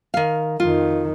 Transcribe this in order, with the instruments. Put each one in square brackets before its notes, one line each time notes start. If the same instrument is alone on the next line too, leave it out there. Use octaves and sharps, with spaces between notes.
[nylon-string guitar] D#3 F5
[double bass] F2 D#3 [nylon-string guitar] F4